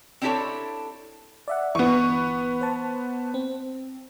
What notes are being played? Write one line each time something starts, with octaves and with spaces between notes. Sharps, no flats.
C4 D4 E4 G4 A4 C#5
D5 E5 F#5
G1 E3 B3 C#6
C5 A5
C4